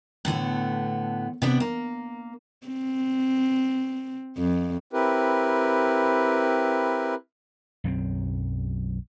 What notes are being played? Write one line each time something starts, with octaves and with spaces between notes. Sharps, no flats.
A2 D3 A3 B3
C3 B3 D4
A#3
C4
F2
C4 E4 G4 A#4 B4
B1 F#2 F#3 C4